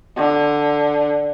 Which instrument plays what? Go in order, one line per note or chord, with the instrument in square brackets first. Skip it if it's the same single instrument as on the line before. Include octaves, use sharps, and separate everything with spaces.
[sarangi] D3